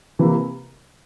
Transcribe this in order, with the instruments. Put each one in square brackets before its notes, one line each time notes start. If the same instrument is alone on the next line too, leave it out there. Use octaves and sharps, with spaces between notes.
[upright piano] C3 E3 A#3